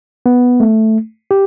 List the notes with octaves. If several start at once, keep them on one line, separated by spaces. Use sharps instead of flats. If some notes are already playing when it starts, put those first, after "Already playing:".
B3
A3
G4